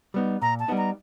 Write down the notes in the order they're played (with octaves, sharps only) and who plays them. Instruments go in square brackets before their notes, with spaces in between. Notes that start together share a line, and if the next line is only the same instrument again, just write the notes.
[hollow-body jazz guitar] G3 B3 D#4
[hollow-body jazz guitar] A#2 [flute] A#5
[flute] A5
[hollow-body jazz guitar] G3 B3 D#4
[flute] A#5